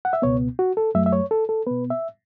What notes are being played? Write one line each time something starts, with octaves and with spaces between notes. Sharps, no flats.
F#5
E5
C#2 B2 B3 C#5
F#4
A4
F#2 F#3 A3 E5
E5
C#5
A4
A4
B2 B3 B4
E5